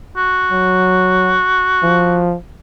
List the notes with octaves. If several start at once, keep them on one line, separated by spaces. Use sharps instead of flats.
F#4
F#3
F3